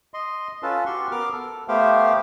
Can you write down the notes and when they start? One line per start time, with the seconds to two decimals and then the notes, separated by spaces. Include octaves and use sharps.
0.14 D#5 C6
0.63 C#4 F4 A4 B4 A5
0.86 F#4 G4 C6 C#6
1.11 B3 A#4 D6 F6
1.32 A4
1.68 A3 B3 G4 C5 F5 G5